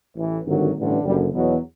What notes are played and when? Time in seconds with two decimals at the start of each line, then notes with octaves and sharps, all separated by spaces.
0.16 A1 A2 E3
0.45 G#1 G2 D3 F#3
0.75 A1 G2 D3
1.04 F#1 F#2 D3 G3
1.33 E2 B2 F#3